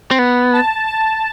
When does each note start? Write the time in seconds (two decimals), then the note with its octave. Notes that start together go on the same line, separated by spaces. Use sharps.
0.11 C4
0.19 B3
0.53 A5
0.86 A5